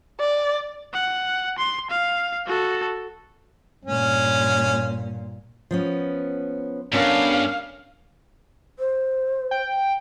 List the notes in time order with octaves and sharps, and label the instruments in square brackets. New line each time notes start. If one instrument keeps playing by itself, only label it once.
[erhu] D5
[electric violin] F#5
C6
F5
F#4 A4
[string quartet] G2 A#2 [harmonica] C#4
[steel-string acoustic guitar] F3 B3 C#4
[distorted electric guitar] G2 [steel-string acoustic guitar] B3 A4 A#4 [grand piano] C#4 D4 [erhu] F5
[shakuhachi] C5
[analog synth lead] G5